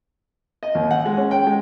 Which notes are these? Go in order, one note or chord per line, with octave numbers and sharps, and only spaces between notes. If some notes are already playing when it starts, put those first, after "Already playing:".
D#5
D#2
F#5
G#3
C#4
G5
G#3